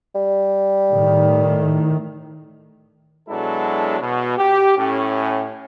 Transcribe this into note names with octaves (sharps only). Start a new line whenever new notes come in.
G3
A2 D#3
B2 F#3 G#3 D4 E4 A4
B2
G4
A2 C#4